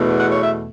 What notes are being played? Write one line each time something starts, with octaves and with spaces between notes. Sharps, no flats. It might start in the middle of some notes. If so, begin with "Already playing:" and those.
Already playing: E2 B2 A3
F#5
C#5
E5